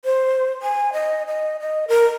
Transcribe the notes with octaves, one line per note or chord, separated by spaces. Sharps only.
C5
G#5
D#5
D#5
D#5
A#4